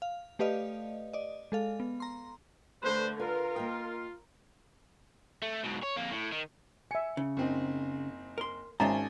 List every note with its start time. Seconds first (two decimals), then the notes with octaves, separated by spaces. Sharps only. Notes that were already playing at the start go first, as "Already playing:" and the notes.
0.02 F5
0.39 A3 G4 B4 D5 D#5 F5
1.13 D5 D#5
1.52 G#3 A4 F5
1.80 B3
2.00 A#5 C6
2.83 D3 A3 B4 C5
3.20 F4 A#4 B4
3.56 A#3 D#5 G5
5.42 A3
5.64 G#2 B2
5.83 C#5
5.97 F2 A#3
6.12 A2
6.32 D#3
6.91 E5 G#5 C#7
7.17 C#3
7.37 F#1 C4 D#4
8.38 A#4 C6
8.80 G#1 G#3 C#4 C5 E5 A5 A#5